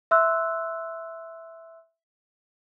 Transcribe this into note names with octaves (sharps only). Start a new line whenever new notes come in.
E5 C6 E6 F#6